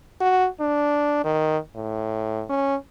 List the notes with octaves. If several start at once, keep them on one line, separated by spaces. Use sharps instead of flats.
F#4
D4
D#3
A2
C#4